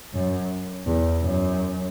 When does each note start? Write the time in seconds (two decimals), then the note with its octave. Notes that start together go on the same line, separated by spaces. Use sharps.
0.14 F#2
0.86 E2
1.22 F#2